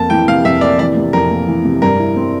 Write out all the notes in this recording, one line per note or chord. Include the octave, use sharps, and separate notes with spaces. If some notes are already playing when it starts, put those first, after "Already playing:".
Already playing: F2 A#3 A5
E3 G5
C3 F5
F2 E5
A#3 D5
E3 D5
C3
F2 A#4
A#3
E3
C3
G2 A#4
E4
C4